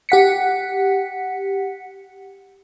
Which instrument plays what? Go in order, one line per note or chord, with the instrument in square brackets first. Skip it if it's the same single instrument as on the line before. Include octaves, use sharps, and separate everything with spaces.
[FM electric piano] G4 F#5 B6 C#7